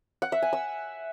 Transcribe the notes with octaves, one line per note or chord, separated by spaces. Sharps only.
F#5
E5
G#5
E6